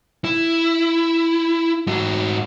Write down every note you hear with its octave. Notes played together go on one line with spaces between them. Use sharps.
E4
G#2 F#4